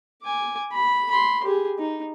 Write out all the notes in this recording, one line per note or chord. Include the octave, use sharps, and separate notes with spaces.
G#5 D6
B5
B5 C6
G4 G#4
D#4